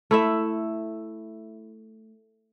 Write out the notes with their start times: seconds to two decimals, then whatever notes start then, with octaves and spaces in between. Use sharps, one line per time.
0.11 A3 E4 E5